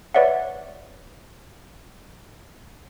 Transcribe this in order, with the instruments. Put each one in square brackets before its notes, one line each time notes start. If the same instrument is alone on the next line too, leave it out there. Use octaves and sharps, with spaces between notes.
[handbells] B4 C#5 D5 E5 F#5